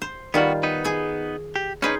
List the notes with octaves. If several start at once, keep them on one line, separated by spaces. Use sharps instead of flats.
C5
D#3 G3 B3 F4 F#4
B3 D#4 B4
G#4 G#5
G4
C#4 D#4 G#4 B4 C5